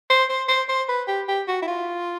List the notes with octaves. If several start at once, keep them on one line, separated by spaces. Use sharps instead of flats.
C5
C5
C5
C5
B4
G4
G4
F#4
E4
F4